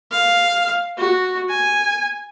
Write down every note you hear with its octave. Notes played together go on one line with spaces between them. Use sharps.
F5
F#4
G#5